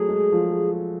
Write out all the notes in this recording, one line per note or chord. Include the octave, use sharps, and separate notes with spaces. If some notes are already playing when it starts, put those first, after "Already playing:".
Already playing: F#3 A3 G#4
G#3
F3